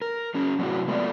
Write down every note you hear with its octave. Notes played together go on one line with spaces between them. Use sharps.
A#4
F#3 C#4 G#4
F#2 A2 C3 C#4 E4 F#4
G#3 A3 B3 F4 C#5 D5